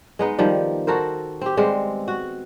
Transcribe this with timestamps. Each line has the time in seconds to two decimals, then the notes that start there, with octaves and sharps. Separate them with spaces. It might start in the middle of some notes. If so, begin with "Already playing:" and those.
0.19 G#3 B3 D#4
0.38 D#3 F3 G3
0.87 F#4 A4 A#4 C5
1.42 C4 G4
1.57 G3 G#3 B3 C4
2.08 F#4